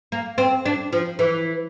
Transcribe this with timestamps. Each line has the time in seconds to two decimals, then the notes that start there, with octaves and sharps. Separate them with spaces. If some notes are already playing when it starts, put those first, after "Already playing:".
0.12 A#3
0.38 C4
0.66 D4
0.93 F3
1.19 E3